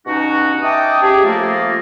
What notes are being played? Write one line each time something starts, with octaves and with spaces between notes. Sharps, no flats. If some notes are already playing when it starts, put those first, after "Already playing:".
G2 B2 C#4 D#4 F#4
D#5 E5 G5 A5 D6 D#6
C#3 G4 G#4
F3 A3 A#3 A4